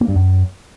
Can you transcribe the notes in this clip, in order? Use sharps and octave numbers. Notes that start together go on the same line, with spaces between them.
A#3
G2
F#2